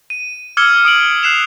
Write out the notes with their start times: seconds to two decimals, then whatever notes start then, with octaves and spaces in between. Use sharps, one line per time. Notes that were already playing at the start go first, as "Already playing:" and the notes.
0.10 D#7
0.57 D6 E6 F6 G#6 C#7 G7
0.85 D#6 D7 F#7
1.23 F#6 C7 E7 F7